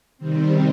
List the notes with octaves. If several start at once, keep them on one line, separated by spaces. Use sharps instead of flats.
C3 D#3 G3 C4